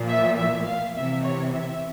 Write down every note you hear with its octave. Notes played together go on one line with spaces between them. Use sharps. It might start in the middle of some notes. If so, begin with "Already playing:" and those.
Already playing: A#2 F3
E5
E5
F5
C3 E3 E5
C#5
E5